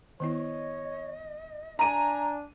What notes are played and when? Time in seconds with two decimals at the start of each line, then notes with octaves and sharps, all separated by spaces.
0.20 D#3 B3 E4 C#5 D#5
1.79 D4 G#5 A#5 D#7